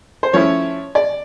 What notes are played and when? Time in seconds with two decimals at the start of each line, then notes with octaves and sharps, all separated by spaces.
0.23 C5
0.33 F3 A3 C#4 E4 C#5
0.95 D5